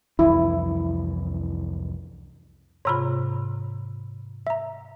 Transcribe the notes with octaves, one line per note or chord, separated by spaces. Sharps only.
C2 F2 E3 E4
G#2 C3 F4 C#5 A#5 B5
E5 A#5